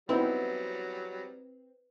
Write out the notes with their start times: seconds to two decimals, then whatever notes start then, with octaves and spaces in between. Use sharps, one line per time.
0.09 F#3 G3 B3 C4 D#4 E4 B4